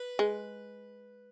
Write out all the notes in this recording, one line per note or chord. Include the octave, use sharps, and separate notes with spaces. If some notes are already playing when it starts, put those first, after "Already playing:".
Already playing: B4
G#3